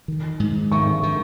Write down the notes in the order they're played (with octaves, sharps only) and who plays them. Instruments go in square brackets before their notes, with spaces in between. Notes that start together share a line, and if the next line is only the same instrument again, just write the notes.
[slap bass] D#3
G#2
[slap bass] D#3 [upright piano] C#6
[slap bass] D#3